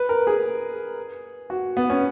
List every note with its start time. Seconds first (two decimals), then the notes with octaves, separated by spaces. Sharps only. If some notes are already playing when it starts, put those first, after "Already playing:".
Already playing: B4
0.09 A#4
0.27 G#4
1.50 F#4
1.77 B3
1.90 C#4